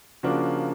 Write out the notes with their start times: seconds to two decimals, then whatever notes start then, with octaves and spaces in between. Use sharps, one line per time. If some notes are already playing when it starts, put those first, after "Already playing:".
0.23 C#3 F3 A#3 D4 F#4